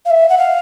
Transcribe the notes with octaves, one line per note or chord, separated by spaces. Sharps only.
F5
E5
F#5
F5